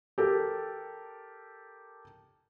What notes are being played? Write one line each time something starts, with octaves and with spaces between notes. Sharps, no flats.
G4 A4 A#4